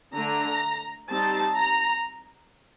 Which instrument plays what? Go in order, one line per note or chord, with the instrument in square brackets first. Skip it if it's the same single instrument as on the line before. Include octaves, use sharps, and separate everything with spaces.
[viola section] D3 A3 D4 A#5
G3 C4 D#4 A5
A#5